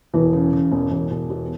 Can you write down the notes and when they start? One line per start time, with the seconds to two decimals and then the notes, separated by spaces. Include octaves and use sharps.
0.14 E1 E3
0.33 C#3
0.53 C#3
0.72 E1
0.91 E1
1.11 E1
1.30 B2